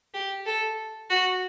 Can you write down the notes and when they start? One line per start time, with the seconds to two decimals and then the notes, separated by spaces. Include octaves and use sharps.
0.14 G4
0.46 A4
1.10 F#4